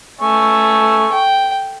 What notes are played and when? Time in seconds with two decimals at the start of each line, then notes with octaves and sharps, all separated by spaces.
0.21 A3 G#5 C#6 E6
1.11 G5